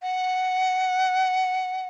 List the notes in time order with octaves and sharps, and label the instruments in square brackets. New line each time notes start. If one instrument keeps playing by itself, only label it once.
[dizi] F#5